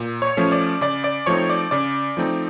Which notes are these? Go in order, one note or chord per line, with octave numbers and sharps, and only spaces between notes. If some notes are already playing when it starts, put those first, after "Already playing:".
Already playing: A#2
C#5 C#6
F3 A3 C#4
D5 D6
C#3 D5 D6
D5 D6
F3 A3 C4 D#4 C#5 C#6
D5 D6
C#3 D5 D6
F3 A3 C4 D#4